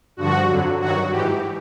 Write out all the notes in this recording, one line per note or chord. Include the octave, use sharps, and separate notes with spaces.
G2 D3 F3 F#4
F2 D3 F#3
G2 D#3 F#3 F#4
G#2 E3 G4